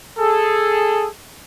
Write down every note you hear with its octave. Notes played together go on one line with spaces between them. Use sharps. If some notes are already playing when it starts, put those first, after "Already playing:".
G#4 A4